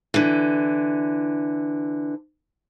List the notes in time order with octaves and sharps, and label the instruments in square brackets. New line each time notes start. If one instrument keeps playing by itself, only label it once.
[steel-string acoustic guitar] D3 E3